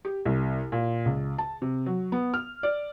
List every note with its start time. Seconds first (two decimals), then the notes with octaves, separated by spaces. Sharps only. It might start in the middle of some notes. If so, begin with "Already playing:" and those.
0.05 G4
0.25 C2
0.72 A#2
1.06 C#2
1.38 A5
1.62 C3
1.86 F#3
2.12 B3
2.34 F6
2.63 D5